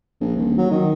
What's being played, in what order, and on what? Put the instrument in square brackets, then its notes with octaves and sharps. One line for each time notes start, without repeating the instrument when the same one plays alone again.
[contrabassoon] A#1
D#1
F#3
D#3